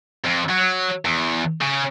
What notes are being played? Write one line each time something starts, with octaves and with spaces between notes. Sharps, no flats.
F2
F#3
E2
C#3